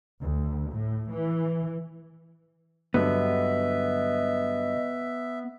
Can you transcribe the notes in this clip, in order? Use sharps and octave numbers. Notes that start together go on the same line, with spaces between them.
D2
A2
E3
G2 D3 F#3 B3 D#5 E5